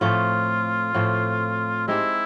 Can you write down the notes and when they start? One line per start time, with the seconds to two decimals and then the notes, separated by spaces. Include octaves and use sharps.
0.01 A2 F3 A3 C4 F4
0.94 A2 F3 A3 C4
1.88 G#3 C4 D#4 E4 G4